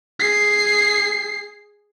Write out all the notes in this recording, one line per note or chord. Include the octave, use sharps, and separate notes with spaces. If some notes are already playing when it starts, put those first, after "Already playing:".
G#4 C7